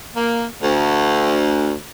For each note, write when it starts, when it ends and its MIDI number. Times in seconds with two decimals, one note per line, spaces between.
0.16 0.45 58
0.62 1.73 38